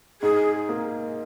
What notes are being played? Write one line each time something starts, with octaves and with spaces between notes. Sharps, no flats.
G#2 G#4
A#3